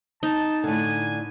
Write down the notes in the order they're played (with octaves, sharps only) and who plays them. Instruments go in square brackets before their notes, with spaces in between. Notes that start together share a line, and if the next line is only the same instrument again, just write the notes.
[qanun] D#4 [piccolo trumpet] A5
[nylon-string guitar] A2 D3 [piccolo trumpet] G#5